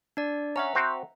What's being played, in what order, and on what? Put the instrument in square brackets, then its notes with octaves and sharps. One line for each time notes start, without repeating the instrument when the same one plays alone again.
[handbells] D4 D5
[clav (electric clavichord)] C#4 [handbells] E5 F#5 A#5
[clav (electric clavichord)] C4 F#4 C5